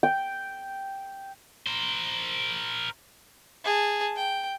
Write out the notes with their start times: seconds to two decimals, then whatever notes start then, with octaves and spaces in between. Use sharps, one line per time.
0.03 G5
1.67 A#4 C5
3.65 G#4 A5
4.16 G5